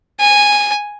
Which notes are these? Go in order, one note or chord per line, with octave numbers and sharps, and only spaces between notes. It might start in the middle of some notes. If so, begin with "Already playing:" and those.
G#5